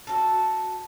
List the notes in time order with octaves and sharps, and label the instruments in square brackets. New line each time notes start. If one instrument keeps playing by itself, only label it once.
[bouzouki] F#4 A4